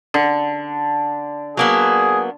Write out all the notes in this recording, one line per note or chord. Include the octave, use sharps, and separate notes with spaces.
D3
F#3 A#3 B3 G#4